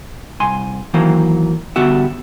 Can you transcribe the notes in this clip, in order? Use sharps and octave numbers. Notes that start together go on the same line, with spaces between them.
C2 G#5 C6
D#3 E3 F#3 A#3 C5
D3 G3 B3 F#4 E5